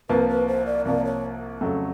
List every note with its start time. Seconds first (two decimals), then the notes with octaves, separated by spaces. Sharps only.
0.09 C2 C3 F3 A#3 B4
0.29 B4
0.48 C5
0.66 D5
0.85 C2 C3 F3 A#3 D5
1.05 C#5
1.61 F2 C#3 F#3 A3